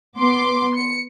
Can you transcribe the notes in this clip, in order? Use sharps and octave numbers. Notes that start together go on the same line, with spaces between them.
B3 C6 D6
C#7